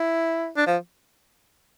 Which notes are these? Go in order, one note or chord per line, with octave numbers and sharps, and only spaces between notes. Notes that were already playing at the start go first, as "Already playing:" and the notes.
Already playing: E4
D4
F3